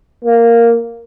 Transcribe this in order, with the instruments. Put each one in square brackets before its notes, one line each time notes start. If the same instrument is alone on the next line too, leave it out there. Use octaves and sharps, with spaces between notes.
[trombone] A#3